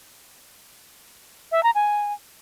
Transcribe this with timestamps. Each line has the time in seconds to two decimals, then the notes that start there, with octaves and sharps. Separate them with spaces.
1.52 E5
1.63 A#5
1.75 G#5